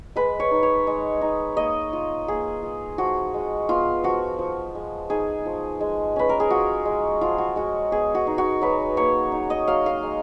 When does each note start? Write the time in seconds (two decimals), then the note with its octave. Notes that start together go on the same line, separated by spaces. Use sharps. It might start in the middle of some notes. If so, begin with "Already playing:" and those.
0.16 G#3 B4
0.40 C#5
0.51 D#4
0.63 C#5
0.87 G#3
1.21 D#4
1.57 A#3 D#5
1.93 F4
2.27 A#3 G#4
2.62 F4
2.98 F3 F#4
3.34 G#3
3.69 B3 F4
4.04 F3 F#4
4.39 F3
4.75 G#3
5.10 D#4 G#4
5.46 F3
5.81 G#3
6.16 C#4 B4
6.29 A#4
6.40 G#4
6.50 F4 F#4
6.86 G#3
7.21 F3 F4
7.38 F#4
7.56 G#3 F#4
7.91 B3 G#4
8.15 F#4
8.27 D#4
8.38 F#4
8.62 F#3 B4
8.97 A#3 C#5
9.32 D#4
9.50 D#5
9.67 F#3 F5
9.86 F5
10.03 G#3